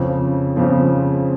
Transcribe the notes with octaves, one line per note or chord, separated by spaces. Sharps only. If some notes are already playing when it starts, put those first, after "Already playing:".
Already playing: F2 C#3 F3 C4
F2 C#3 F3 C4